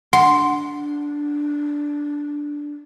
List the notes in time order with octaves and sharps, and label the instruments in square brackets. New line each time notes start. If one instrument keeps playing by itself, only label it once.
[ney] D4 [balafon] F#5 [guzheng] C6